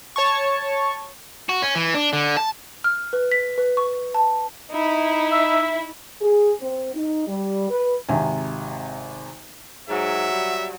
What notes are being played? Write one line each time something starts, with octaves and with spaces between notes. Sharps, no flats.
C#5 A5 C#6
F#4
C#4
E3
D4
D3
A5
F6
B4
B6
B4
C#6
A5
D#4 E4
E5 E6
G#4
C4
D#4
G3
B4
G#1 C3 G#5
G#2 F#3 E5
G3